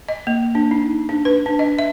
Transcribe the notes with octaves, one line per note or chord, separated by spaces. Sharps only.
D#5
A#3
D4
D#4
D4
B4
D4
D#5
E5